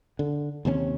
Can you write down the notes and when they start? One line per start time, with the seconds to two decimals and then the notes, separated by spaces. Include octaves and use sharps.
0.19 D3
0.65 D#2 C3 A#3 C#4